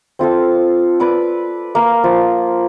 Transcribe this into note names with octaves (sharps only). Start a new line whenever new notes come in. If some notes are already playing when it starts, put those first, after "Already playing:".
C4 F4 A4 F5
B4 D5 D6 E6
A#3 F5
F3